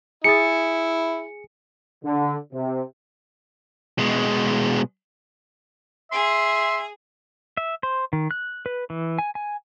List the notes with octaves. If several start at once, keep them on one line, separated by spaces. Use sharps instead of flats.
E4 G#4 D#6 A6 C#7
D3
C3
B2 G#3
G#4 E5 C6
E5
C5
D#3
F#6
B4
E3
G#5
G#5